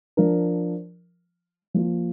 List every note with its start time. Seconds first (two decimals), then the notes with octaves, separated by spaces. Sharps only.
0.17 F3 D4 A#4
1.74 F3 A#3 F4